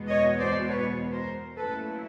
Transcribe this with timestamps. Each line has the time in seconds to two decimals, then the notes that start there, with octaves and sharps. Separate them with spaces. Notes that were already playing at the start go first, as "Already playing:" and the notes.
Already playing: E2 B2 G#3 B3
0.09 C#5 D#5
0.39 C5 D5
0.68 B4 C#5
1.12 A#4 C5
1.56 A#2 F#3 A3 C#4 E4 A4 B4